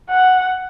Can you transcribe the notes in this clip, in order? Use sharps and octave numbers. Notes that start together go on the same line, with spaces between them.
F#5